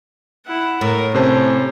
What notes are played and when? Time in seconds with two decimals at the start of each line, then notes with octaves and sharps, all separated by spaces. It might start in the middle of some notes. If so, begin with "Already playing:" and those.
0.47 E4 F#5
0.81 A2 A#4
1.14 C3 C#4 C5 A5